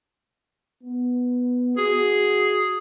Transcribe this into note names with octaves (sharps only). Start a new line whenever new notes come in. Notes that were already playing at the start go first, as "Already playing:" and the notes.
B3
F#4 G#4